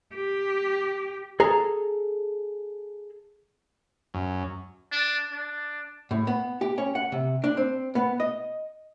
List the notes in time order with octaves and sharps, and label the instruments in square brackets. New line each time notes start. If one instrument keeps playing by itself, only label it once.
[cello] G4
[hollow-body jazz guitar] G#4 A4 A#5
[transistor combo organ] F#2
[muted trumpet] D4
D4
[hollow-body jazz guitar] A2
B3
G4
C#4
F#5
C3
D4
C4
B3
D#5